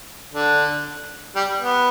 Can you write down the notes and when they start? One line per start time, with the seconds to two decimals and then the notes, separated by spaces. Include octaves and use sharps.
0.33 D3
1.35 G3
1.60 B3